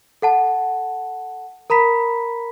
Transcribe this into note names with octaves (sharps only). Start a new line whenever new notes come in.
A4 F#5 A5
A#4 A#5 B5 B6